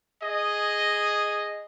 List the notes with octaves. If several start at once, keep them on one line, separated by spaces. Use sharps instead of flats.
G#4 D#5